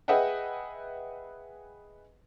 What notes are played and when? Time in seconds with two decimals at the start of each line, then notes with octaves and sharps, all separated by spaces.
0.08 G#4 B4 D#5 E5 F#5 G5